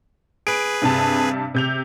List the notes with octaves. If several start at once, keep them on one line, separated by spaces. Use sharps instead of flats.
G#4 B4 D7
G2 C3 A5
C3 G6 F7